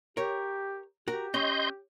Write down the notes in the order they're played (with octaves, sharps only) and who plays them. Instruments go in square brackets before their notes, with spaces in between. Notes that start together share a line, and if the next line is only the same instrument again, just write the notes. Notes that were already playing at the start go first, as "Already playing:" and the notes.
[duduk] G4 [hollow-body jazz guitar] A#4 C#5
[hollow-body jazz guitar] F#4 A#4 [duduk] G4
[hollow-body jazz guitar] C#4 [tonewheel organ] D#5 C6 G6